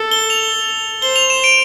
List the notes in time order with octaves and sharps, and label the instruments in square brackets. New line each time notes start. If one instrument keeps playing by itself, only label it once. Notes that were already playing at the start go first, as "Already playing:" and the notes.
Already playing: [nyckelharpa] A4
[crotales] G7
F7
[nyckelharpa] C5 [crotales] G7
[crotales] F7
E7
D7